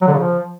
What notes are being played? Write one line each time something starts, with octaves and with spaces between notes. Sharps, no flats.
F#3
D3
C#3
F3